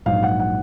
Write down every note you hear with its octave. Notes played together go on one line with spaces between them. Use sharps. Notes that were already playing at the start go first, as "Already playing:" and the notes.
A#1 G#2 F#3 F5
F#5
F#5